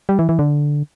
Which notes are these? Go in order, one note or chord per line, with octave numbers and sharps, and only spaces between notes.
G3
E3
E3
D3